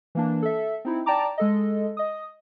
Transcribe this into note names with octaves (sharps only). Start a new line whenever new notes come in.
E3 A#3 D4
A4 E5
C4 D#4 E4
D5 G5 A5 A#5 D6
G#3 A4 D#5
D#5 D#6